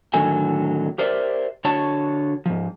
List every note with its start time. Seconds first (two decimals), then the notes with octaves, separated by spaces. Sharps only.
0.14 A2 D3 D#3 F#3 A4 G#5
0.98 G4 A#4 C5 D5 E5
1.65 D3 F#4 C#5 A5
2.46 G#2 F3